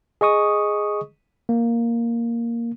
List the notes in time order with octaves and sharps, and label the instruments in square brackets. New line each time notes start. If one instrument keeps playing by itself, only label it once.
[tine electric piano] G#4 D#5 C#6 D#6
A#3